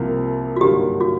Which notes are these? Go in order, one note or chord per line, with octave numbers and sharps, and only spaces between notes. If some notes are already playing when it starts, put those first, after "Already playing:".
Already playing: C2 C3 F3 A#3
F#4
G#1 G2 D3 F#3 A#3 G4
F#4